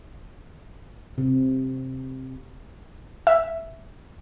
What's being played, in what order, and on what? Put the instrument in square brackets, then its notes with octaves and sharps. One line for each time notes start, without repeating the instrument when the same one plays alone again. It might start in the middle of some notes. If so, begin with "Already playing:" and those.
[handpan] C3
[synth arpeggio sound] E5